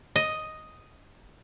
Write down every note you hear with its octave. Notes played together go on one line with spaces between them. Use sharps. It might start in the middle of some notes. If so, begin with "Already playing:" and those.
D#5